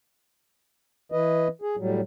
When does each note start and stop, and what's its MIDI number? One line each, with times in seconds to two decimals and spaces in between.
1.12 1.48 52
1.12 1.48 71
1.12 1.48 75
1.62 1.76 68
1.77 2.01 45
1.77 2.01 54
1.77 2.01 55